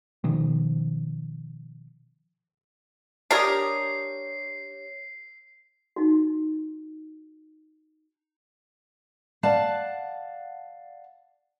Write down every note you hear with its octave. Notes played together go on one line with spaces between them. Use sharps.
B2 D#3 F3
D4 G4 A#4 C#5 D#6 C7
D#4 F#4
D5 F5 F#5 A5